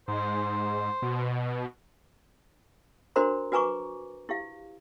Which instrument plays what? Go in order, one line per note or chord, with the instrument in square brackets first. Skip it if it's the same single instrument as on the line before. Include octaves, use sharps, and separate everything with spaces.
[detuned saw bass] G#2 [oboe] C5
[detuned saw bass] B2
[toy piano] D4 F#4 A#4 C5 A#5 C6
F#4 B4 G#5 A#5 C#6 D6
E4 G4 F5